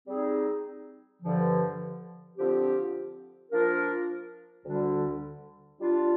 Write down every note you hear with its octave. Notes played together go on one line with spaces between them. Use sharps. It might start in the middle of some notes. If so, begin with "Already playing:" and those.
G3 C4 D#4 G#4
G2 D3 F3
D3 F3 C4 G4
F3 A#3 D4 F4 A#4
D2 D3 G3 D4
G3 D4 F4